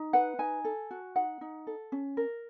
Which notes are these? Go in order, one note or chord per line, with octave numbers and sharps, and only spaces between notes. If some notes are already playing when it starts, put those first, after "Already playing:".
Already playing: D#4
B4 F#5
D#4 G#5
A4
F#4
D#4 F#5
D#4
A4
C#4
A#4